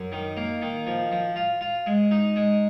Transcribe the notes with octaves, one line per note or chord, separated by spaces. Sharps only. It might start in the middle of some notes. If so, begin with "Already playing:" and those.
Already playing: F#2
D#3
A#3
D#3
F3
F3
F4
F4
G#3
D#4
G#3